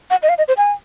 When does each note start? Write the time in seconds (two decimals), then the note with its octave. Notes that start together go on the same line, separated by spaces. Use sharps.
0.10 F#5
0.23 D#5
0.29 F5
0.38 D#5
0.48 C5
0.57 G#5